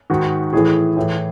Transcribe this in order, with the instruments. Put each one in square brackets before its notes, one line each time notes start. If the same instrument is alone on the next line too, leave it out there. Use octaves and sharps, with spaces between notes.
[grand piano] G#2 D#3 F#4
A2 E3 G#4
A2 E3